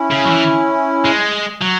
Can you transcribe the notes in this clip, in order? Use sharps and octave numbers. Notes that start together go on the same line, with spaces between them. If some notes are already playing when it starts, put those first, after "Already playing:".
Already playing: C#4 E4
C#3
F#3
E3
G#3
F#3